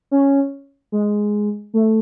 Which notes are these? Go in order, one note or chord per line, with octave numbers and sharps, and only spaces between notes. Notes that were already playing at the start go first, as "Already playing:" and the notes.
C#4
G#3
A3